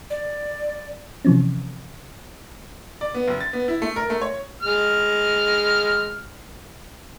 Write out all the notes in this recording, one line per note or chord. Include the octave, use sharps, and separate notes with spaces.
D5
C3 E3 F3 C4 C#4
D5
B3
F#1
A6
B3
E4
A3
A#4
A3
C#5
G#3 F6